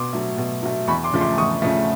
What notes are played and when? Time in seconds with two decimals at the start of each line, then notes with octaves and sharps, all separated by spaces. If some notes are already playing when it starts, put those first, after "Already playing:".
Already playing: B2 C6 D6
0.13 F#3 A3
0.38 B2
0.63 F#3 A3
0.88 E2 B5 C#6
1.04 C6 D6
1.13 C#3 F3 A3
1.21 C6 D6
1.37 E2 C#6 D#6
1.62 C#3 F3 A3